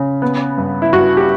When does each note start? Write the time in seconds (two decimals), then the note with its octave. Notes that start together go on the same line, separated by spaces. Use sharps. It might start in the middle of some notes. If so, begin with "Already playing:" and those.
Already playing: C#3
0.22 B3
0.58 G2
0.82 E4
0.93 G2 F#4
1.17 G4